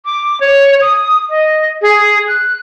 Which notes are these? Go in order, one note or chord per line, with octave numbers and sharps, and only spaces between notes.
D6
C#5
D#6
D#5
G#4
F#6